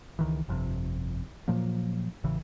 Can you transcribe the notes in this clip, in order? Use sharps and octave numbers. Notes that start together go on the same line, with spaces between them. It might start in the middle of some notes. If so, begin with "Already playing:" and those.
C#2 D#3 E3
G1 F2 C3
A#2 F3 F#3 A#3
A1 C#3 E3